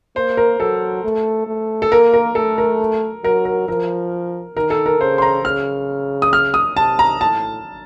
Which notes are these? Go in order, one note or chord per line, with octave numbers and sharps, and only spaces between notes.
A#3 C5
A#4
F#3 A4
A3
A3
A4
A#3 A#4
A#4
A3 A4
A#4
F#3 A#4
A#4
F3 A#4
D#3 A#4
A4
A#4
C#3 C5
C6
A#5
C#3 F6
D#6
F6
D#6
C3 A5
A#5
A2 A5